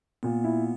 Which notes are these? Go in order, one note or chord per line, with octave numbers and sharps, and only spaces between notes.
A#2 B3
E4